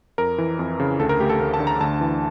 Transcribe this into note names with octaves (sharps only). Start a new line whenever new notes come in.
F2 A#4
E3
F2
C#3
D2 A4
A#4
A3 G4
A4
D2 A#4
A5
D3
A#5
D2 A5
E3